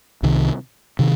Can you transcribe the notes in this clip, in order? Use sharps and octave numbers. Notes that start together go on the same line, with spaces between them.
C2 C3 D#3
C3 D#3